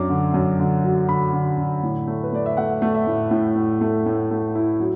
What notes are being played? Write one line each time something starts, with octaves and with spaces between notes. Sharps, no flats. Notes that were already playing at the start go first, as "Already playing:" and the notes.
Already playing: F#2 F#3 D4 D6
D3
F#2
D3
F#3
D3 B5
D3
D3
A2
A3
B4
A3 D5
E5
A3 F#5
A3
E5
A2
A2
A2
A3
A2
A3
E4
F#3